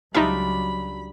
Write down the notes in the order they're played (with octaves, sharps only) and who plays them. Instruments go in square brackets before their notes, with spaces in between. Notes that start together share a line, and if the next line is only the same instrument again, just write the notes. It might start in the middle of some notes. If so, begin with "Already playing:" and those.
[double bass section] C#2 F#3 [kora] G3 D4 F4 [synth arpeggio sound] D#4 E5 [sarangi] B5